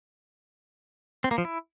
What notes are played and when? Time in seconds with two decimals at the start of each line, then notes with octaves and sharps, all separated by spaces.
1.24 C4
1.31 A#3
1.38 F3
1.45 E4